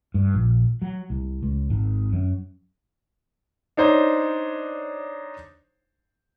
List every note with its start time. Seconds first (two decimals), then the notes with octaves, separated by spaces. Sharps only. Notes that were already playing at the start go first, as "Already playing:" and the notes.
0.14 G2
0.34 A#1
0.82 F#3
1.10 C2
1.43 C#2
1.70 G#1
2.12 F#2
3.77 D4 D#4 C5 C#5